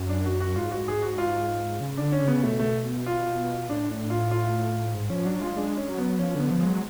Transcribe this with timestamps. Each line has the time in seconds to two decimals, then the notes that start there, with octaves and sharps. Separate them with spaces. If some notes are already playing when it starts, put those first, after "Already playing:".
Already playing: F#2
0.09 D4
0.25 F#4
0.40 F#4
0.56 G#2 F4
0.71 F#4
0.88 G#4
1.02 F#4
1.18 F4
1.81 C#3
1.97 D3 D4
2.12 C#4
2.23 C#3 B3
2.43 B2 A3
2.59 A3
3.06 F4
3.69 A2 D4
3.90 D4
4.10 F4
4.31 F4
4.94 G#2
5.10 F3 C#4
5.26 F#3 D4
5.41 G#3 F4
5.56 G#3 D4
5.77 C#4
5.88 F#3
5.98 B3
6.19 F3 C#4
6.35 D3 B3
6.51 F3
6.61 G#3
6.66 F#3